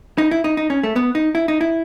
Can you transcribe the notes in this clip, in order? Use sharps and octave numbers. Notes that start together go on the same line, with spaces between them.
D#4
E4
D#4
D#4
C#4
A3
B3
D#4
E4
D#4
E4